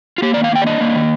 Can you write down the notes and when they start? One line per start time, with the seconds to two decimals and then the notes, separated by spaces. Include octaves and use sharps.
0.18 F4
0.22 A#3 G4
0.34 D#3 D5
0.44 F5
0.52 A#3 G5
0.62 D5
0.67 D4 D#5
0.81 A#3
0.95 D#3